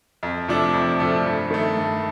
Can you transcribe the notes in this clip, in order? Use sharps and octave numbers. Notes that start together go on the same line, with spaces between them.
F2
C3 F3 A3 D4
F2
C3 F3 A3 D4
G2
D#3 A3
G2